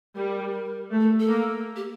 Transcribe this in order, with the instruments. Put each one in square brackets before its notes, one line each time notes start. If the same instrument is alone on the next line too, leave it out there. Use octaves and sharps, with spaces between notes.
[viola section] G3 [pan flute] A#4
[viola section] A3
[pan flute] A4
A4
[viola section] A#3
[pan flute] G4